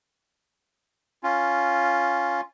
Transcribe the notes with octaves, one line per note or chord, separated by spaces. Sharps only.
C#4 F4